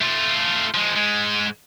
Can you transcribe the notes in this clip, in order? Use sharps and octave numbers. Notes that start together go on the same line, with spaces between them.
A3 F4
F3 G#3
G#2 G#3